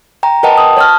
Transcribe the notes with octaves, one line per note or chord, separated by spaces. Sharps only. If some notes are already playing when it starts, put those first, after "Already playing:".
G5 A#5
A#4 B4 D#5 F#5 G5 A5
D#6
C#5 A5 F6